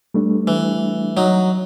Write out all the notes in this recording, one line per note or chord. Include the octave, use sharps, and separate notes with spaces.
G3 A3 D4
E3
F#3 D#4